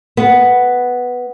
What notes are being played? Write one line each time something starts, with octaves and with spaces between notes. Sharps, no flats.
B3